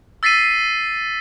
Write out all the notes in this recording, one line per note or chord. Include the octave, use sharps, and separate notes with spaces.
E6 A6 B6 C7 D#7